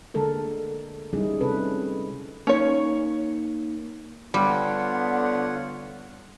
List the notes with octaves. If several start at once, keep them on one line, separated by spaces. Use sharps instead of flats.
D3 G#3 A#3 A4 A#4
G3 G#3 C#4 D#4 E4 G#4
C3 C4 C#4 A4 B4
A#3 C#4 D#4 C#5
D3 G3 B3 F4 C#5 F#5